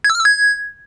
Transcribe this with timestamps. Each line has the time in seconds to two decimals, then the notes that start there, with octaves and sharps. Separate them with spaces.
0.04 G#6
0.10 E6
0.15 F6
0.20 E6
0.25 G#6